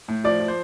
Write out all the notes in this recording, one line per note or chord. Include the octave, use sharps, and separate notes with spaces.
A2
F3 D5
F3
C5